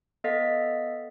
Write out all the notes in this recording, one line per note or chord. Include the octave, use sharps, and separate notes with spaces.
B3 A4 D#5 F5 A6 B6